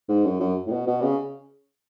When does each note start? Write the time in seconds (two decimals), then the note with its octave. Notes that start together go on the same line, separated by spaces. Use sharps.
0.09 G#2
0.25 F#2
0.40 F#2
0.67 A2
0.72 B2
0.87 B2
1.02 C#3